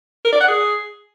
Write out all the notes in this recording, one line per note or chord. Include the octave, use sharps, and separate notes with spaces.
A#4
D5
F#5
G#4